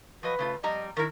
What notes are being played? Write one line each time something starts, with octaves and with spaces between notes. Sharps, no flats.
F3 F#3 B4 D#5
C#3 A3 F4
F2 G3 D#5 A#5
D#3 E4 A#4